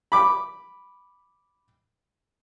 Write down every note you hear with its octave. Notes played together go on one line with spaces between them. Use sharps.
B5 D6